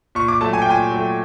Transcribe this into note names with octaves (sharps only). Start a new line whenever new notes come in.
A#2 C#6
D6
F#3 A3 A5
G#5
G5
A#2 G#5
F#3 A3